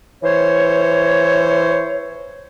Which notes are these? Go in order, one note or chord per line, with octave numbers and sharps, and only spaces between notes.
E3 C5 C#5